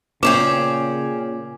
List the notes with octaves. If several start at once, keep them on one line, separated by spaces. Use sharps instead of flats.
A#2 C#3 C#4 G#4 G5 D6 E7